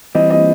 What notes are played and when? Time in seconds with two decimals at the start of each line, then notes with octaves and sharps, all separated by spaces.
0.15 E3 G3 C4 D#5
0.30 D#5